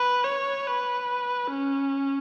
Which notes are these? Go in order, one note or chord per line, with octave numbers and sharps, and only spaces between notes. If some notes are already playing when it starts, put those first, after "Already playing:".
Already playing: B4
C#5
B4
C#4